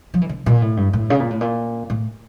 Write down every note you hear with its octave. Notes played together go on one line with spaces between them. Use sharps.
F3
E3
D3
A#2
A2
G2
A2
C#3
A#2
A2
A#2
A2